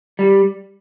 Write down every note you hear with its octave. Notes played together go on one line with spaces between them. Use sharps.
G3